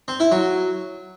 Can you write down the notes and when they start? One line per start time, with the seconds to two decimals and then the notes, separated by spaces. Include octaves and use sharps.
0.08 C4
0.20 E4
0.32 F#3